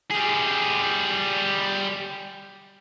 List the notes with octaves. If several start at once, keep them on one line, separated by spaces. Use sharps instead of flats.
G3 G#4